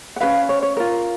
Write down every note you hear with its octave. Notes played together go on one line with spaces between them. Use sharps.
F#5
C#4 F#4 B4 F5
C#5
C#5
F4 A#4